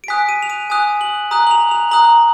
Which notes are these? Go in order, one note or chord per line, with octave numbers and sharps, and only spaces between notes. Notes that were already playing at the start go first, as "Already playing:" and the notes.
D7
G#5 D#6 F#6 B6
D#7
F7
D#7
G#5 D#6 F#6
F#7
A#5 D#6 F#6
F#7
F7
F7
A#5 D#6 F#6 F#7